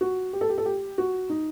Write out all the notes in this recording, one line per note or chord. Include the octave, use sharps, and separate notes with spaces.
F#4
G4
A4
G4
A4
G4
F#4
D#4